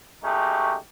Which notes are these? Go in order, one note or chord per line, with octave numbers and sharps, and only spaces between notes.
G#3 A3 C#4 D#4 F#4 G4